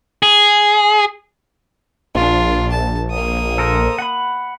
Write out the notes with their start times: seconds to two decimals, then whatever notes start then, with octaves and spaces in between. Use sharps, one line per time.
0.23 G#4
2.15 A#1 D4 F4
2.72 A5
3.11 A#3 D#6
3.58 A4 A#4 C5
3.98 F#5 B5